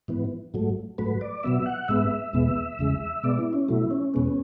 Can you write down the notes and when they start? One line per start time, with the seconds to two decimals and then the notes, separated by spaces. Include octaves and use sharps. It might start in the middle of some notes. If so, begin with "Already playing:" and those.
0.08 G#2 E3 B3
0.54 G#2 F#3 A3
0.98 G#2 F#3 A3 B4
1.21 D5
1.43 B2 F#3 B3 E5
1.66 F#5
1.88 G#2 G#3 B3 E5
2.33 E2 B2 G#3 B3
2.79 E2 C#3 G#3
3.23 B2 G#3 B3 D5
3.39 E4
3.53 C#4
3.68 B2 F#3 A3 E4
3.91 C#4
4.14 E2 B2 G#3 B3